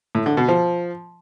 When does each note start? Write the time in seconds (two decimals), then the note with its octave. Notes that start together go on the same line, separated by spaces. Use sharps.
0.15 A2
0.26 D3
0.37 B2
0.48 F3